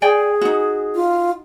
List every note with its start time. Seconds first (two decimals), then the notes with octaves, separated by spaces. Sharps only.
0.02 G#4 D5 G5 G#5
0.41 D#4 F#4
0.95 F4